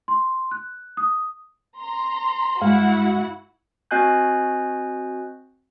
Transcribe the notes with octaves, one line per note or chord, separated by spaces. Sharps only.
C6
F#6
D#6
A#5 C6
G2 G#3 E4 F#4 F5 F#5
C4 F#4 D#5 G#5 F#6 G6